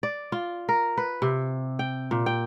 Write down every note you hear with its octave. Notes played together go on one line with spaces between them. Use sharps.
D5
F4
A#4
B4
C3
G5
A#2
G5